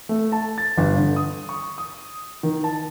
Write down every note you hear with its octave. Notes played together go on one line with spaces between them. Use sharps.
A3
A5
A6
G1
D3
D#6
C#6
D#6
D#3
A5